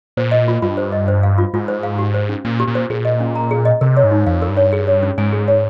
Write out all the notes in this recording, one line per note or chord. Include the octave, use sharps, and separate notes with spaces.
A#2 C5
D#5
F4
G2 F4
C5
D#5
C5
F5
F4
G#2 F4
C5
F5
G4
C5
C#4
A#2 C#4
G4
A#2
C5
A#2 G#4
D#5
C#4
A#5
G#4
D#5
C3 A#4
C#5
G#2
D#4
F2 F5
A#4
G2
C#5
G#4
C#5
C#4
G#2 G#5
G#4
C#5